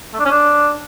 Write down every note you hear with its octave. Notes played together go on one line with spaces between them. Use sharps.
A3
D4
C#4
D4